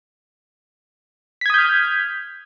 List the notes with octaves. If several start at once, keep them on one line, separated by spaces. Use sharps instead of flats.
D#6 F6 G6 G#6 B6